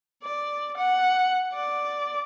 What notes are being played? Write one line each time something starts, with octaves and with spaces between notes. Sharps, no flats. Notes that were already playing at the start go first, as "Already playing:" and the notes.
D5
F#5
D5